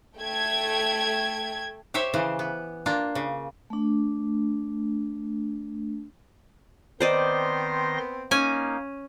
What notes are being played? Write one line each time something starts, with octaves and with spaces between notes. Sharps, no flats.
A3 G5 G#6
G4 C5 C#5 E5
C#3 E3 C5
B3
A#3 D4 F4
C#3
A3 D4
D#3 B3 C4 C5 D5 D#5 C6 A#6
A#3 C#4 D#4 G#5